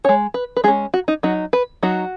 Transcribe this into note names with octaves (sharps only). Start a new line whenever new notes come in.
C#4 C#5
G#3
B4
B4
G#3 C#4 G#4
F#4
D#4
F#3 D#4 F#4
B4
F#3 D#4 F#4